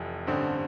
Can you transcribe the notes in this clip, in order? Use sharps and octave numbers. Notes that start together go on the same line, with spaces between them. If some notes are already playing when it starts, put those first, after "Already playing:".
Already playing: F1 F2 E3
A1 G2 D3 C4